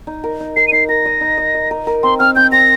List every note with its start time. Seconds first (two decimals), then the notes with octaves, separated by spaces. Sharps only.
0.07 D#4
0.24 A#4
0.40 D#4
0.56 A#4 C7
0.68 D#7
0.72 D#4 C7
0.89 A#4 A#6
1.05 D#5
1.21 D#4
1.38 D#5
1.54 D#5
1.71 A#4
1.87 A#4
2.03 C4 C6
2.19 C4 F6
2.36 C4 G6
2.52 C4 A#6